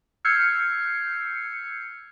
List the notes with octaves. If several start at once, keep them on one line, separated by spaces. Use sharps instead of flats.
E6 F6 G6 G#6 C7 C#7